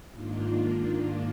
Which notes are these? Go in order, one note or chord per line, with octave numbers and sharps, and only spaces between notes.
G#2 D#3 A#3 D4 F4